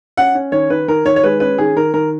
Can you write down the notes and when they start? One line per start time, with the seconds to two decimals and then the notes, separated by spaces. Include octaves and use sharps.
0.17 C#4 F#5
0.35 C#4
0.52 D#3 C#5
0.70 D#3 B4
0.88 D#3 A#4
1.05 D#3 C#5
1.16 C#5
1.24 G#3 B4
1.40 C#4 B4
1.58 D#3 G#4
1.76 D#3 A#4
1.94 D#3 A#4